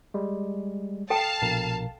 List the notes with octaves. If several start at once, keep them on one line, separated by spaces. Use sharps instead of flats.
G3 G#3
A4 F5 G5 A5
A#1 B2 A#4